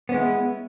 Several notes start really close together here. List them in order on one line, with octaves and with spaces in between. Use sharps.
B3 C#4 G#3 E4